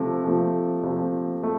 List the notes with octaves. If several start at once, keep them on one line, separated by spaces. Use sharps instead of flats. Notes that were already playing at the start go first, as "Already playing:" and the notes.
Already playing: C3 F3 A3
C3 F3 A3
C3 F3 A3
A3